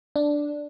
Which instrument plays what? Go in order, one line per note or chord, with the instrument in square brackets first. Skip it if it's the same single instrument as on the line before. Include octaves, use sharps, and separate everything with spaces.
[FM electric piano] D4